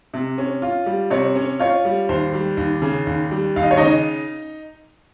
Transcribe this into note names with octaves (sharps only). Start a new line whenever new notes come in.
C3
C#4
F4
G3
C3 C#5
C#4
F4 C#5
G3
D#2 C5
G3
D#2
C#3
D#2
G3
D#2 F5
D#5
C#5
C#3 D#4 D#5